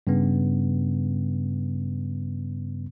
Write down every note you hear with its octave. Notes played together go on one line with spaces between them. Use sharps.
G2 C#3 B3